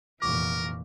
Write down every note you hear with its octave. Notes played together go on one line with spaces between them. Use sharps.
F1 A#2 E3 A#4 C#6 D6